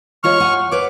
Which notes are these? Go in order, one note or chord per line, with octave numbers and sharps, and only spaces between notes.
G#3 F4 C#5 C#6 F6
F#5 G#5
B4 C#5 D6